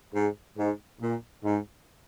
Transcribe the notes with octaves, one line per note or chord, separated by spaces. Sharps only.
G#2
G#2
A#2
G#2